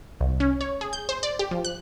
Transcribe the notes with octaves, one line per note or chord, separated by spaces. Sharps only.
C2
C#4
C#5
G#4
G6
C5
D5
G4
F3
F#6